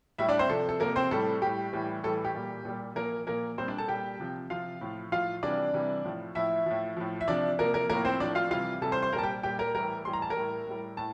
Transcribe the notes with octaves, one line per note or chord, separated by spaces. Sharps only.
A2 G3 E4 E5
D4 D5
C4 C5
C3 F3 A4
A4
C3 F3 A#3 A#4
C4 C5
A2 G3 A4
A2 G3 G4
A2 E3 G3
A2 E3 G3 A4
G4
A#2 G3
A#2 G3
A#2 F3 A#3 A#4
A#2 F3 A#3 A#4
A#2 G3 C4 C5
D4 D5
A4 A5
A#2 G3 G4 G5
C3 F3
C3 F3 F4 F5
A2 F3
A2 F3 F4 F5
C3 E3 G3 D4 D5
C3 E3 G3
A2 F3
A2 F3 E4 E5
A2 F3
A2 F3
E5
C3 F3 D4 D5
C3 F3 A#3 A#4
A#3 A#4
A2 F3 A#3 A#4
C4 C5
A2 F3 D4 D5
F4 F5
C3 E3 G3 F4 F5
C3 E3 G3 A4 A5
C5 C6
C5 C6
A#2 G3 A#4 A5 A#5
G4 G5
A#2 G3 G4 G5
A#4 A#5
A2 E3 G3 A#4 A#5
A2 E3 G3 C6
A#5
A5
A#4 A#5
A2 G3
A2 G3
A2 A5